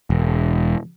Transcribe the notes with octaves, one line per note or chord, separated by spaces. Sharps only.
E1